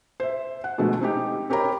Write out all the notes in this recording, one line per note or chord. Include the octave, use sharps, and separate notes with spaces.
C5 E5
F#5
B2 D3 F3 G#3 A3
C4 D#4 G4
C4 G4 A#4 C#5 A#5 B5